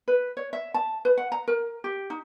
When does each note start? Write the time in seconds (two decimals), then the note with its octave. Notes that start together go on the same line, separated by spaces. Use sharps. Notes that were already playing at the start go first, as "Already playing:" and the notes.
0.08 B4
0.37 C#5
0.53 E5
0.74 A5
1.05 B4
1.18 F#5
1.32 A#5
1.48 A#4
1.84 G4
2.10 D#4